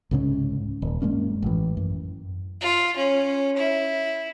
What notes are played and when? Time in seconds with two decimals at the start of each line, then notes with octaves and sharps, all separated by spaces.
0.11 C2 G#2 C#3 C#4
0.82 D#1
1.02 G2 G#3 A#3 C#4
1.42 A1 E3
1.77 F#2
2.61 F4
2.96 C#4
3.56 E4